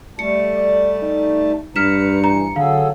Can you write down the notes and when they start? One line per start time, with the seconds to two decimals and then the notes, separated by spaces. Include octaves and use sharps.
0.19 G3 A3 A5 C#7
0.56 D5
1.02 D#4
1.76 G2 B4 A#5 F6 B6 C#7 E7
2.24 E3 A#5
2.56 D3 F#3 G#4 A4 F5